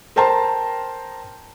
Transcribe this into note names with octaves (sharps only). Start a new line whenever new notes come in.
A#4 C5 G5 A5 A#5 C6